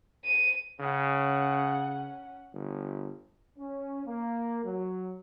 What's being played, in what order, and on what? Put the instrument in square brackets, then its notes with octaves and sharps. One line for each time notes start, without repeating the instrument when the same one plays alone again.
[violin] D#7
[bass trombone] C#3 [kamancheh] C#4 F#5
[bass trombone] G1
[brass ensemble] C#4
A#3
F#3